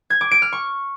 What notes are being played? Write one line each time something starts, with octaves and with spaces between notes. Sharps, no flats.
G#6
D6
D7
F6
C#6